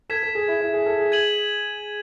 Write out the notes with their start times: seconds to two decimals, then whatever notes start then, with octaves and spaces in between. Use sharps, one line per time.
0.09 A4 G#6 B6 E7
0.23 A4
0.35 G#4
0.48 E4
0.61 E4
0.73 G#4
0.86 A4
0.99 G#4
1.12 G#6 D#7 F#7